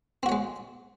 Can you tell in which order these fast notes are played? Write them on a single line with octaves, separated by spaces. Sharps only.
C4 F#4 C#5 G#3